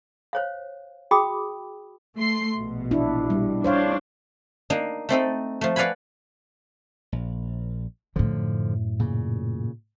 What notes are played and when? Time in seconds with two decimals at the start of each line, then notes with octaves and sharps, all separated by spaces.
0.33 C5 C#5 F5
1.11 F#4 G#4 G5 B5 D6 D#6
2.17 A3 C6 C7
2.57 A#1 B2
2.91 D4 E4
3.30 G3
3.64 D4 C5 C#5 F5
4.70 A#3 D4 D#4
5.09 A3 C4 D#4 A4
5.61 F3 A3
5.76 B4 D5 F5 F#5 G#5 B5
7.12 A#1
8.16 F#2 A2 D3 F3
8.99 A#2 C#3